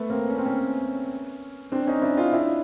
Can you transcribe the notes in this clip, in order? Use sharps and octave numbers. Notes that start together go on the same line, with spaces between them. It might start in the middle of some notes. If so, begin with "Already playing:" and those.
Already playing: A3 B3
A#3 C4
C#4
C4
B3 C#4
C4 D4
C#4 D#4
D4 E4
D#4 F4
D4 E4